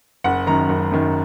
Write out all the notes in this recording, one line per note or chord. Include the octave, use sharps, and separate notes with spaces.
F#1 F#5
F#2 D#3 A#5
F#1
F#2 D#3